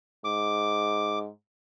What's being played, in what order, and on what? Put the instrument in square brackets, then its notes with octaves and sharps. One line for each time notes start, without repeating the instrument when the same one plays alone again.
[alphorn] G#2 [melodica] D6